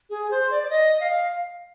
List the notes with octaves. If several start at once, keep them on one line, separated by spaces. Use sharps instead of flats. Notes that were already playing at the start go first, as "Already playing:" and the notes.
G#4
C5
D5
D5
D#5
F5